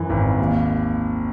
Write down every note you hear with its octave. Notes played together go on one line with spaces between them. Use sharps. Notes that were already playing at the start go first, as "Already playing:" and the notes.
Already playing: F#2 E3
G#1
D#2